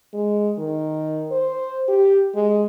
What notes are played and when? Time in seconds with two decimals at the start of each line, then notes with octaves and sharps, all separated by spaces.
0.14 G#3
0.58 D#3
1.32 C5
1.88 G4
2.35 G#3